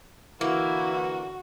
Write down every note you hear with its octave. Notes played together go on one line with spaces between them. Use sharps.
D3 E3 A#3 E4 F#4